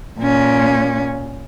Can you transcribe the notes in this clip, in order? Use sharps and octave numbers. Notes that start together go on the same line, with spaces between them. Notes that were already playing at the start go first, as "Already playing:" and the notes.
A#2 C#4